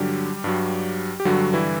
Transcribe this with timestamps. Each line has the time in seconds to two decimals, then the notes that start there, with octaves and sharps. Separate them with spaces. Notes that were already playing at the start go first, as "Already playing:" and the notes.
Already playing: G2 D3 F#3 G3 G4
0.44 G2 F#3
1.20 G4
1.25 G2 D3 F#3 G3 F#4
1.53 E3 E4